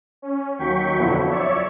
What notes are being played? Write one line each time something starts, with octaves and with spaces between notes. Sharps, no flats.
C#4
D#2 F#3 G5 C#6 B6
F2 B2 D3 F3 F#3 E4
C#5 D5 E5 C#6